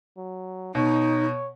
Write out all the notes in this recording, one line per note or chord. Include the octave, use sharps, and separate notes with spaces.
F#3
B2 D#4 C#5